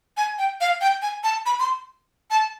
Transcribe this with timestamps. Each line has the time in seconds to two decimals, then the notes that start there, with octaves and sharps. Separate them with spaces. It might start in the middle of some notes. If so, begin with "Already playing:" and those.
0.17 G#5
0.38 G5
0.61 F5
0.81 G5
1.02 G#5
1.24 A5
1.46 B5
1.59 C6
2.31 A5